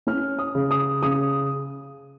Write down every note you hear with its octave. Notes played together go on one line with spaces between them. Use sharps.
C#4 F6
D#6
C#3
D#6
C#3 D#6